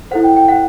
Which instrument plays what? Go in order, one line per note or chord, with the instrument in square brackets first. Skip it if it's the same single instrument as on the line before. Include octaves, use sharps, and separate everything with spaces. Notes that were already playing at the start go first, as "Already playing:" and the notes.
[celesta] E4 A4 C5 F#5
G5
G5
F#5